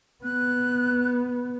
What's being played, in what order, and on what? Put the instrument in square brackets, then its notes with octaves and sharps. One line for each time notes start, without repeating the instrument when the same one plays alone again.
[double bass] B3 [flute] F#6